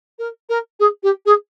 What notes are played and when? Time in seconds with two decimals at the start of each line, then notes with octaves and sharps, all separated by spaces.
0.19 A#4
0.49 A#4
0.80 G#4
1.03 G4
1.26 G#4